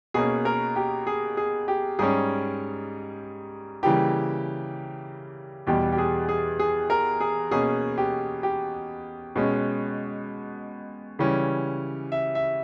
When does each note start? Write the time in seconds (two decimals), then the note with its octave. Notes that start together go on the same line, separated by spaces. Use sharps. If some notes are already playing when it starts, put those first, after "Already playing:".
0.14 B2 A#3 C#4 G#4
0.45 A#4
0.76 G4
1.07 G#4
1.37 G#4
1.68 G4
1.99 G#2 G3 C#4 G#4
3.83 C#3 E3 G3 A#3 G4
5.67 E2 B2 G3 G4
5.92 G4
5.98 G#4
6.29 G#4
6.59 G#4
6.90 A#4
7.20 G#4
7.51 B2 A#3 C#4 G#4
7.98 G4
8.43 G4
9.36 B2 G#3 C#4
11.19 C#3 E3 G3 C#4
12.12 E5
12.35 E5